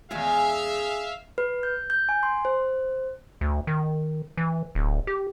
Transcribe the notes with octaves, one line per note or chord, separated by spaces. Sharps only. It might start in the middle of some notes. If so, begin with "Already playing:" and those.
E2 G#3 C#4 G#4 E5 F5 G#5
B4
G6
G6
G#5
C6
C5
D2
D#3
E3
D1
G4